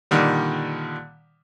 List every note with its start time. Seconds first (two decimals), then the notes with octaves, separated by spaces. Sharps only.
0.11 A#2 D3 D#3 G3